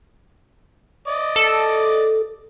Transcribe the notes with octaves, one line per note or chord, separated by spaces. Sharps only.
D5 D#5
A4